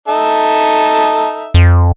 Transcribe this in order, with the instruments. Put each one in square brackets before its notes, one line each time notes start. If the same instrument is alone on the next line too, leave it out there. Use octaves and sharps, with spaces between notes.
[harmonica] D#4 A4 E5
[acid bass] F2